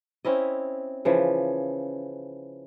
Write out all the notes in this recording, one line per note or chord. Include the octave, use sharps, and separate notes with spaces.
C4 C#4 E4 D#5
C#3 E3 F3